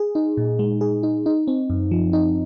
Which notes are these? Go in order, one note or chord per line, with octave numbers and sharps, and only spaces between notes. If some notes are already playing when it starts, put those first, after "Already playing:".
Already playing: G#4
D#4
A#2
G#3
G#4
D#4
D#4
C4
F#2
F3
D#4